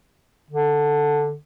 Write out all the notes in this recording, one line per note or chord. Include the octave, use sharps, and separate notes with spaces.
D3